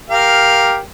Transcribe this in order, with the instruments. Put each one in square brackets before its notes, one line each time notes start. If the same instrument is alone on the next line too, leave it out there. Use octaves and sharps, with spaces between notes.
[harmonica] G4 A#4 F5